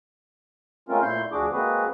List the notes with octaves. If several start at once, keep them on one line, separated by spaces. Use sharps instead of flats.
G#3 A3 C4 C#4 F4 A#4
A#2 A3 E4 C6 G6
D2 F3 D4 F#4 G#4 D6
G#3 A#3 C4 F#4 G#4 B4